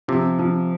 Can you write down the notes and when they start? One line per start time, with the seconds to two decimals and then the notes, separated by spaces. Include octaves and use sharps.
0.08 C3 F3
0.39 F3